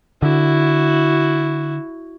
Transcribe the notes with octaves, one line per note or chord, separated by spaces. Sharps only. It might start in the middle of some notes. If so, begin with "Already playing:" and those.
D3 E4 F#4